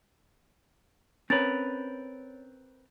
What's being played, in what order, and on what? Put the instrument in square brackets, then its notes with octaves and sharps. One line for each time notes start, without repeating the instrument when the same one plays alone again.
[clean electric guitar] C4 A#4 B4 [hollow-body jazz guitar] C#4 A#5 [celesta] C#5 A6